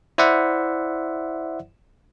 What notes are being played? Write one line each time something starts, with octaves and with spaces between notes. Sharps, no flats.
E4 C5 D5 E5 F#5